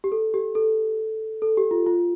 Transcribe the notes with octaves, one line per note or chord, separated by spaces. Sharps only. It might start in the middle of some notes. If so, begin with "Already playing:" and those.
G4
A4
G4
A4
A4
G4
F4
F4